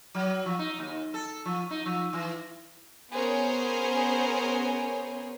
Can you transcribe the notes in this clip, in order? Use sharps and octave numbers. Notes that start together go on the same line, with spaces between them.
F#3
F3
D#4
D#2
A4
F3
D#4
F3
E3
B3 C#4 G#4 A#4 C5 C#5